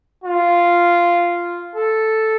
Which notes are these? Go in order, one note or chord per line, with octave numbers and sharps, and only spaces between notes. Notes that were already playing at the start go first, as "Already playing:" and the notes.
F4
A4